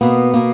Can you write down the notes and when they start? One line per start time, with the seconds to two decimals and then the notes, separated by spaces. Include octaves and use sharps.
0.01 B2 A#3 B3
0.34 B2 A#3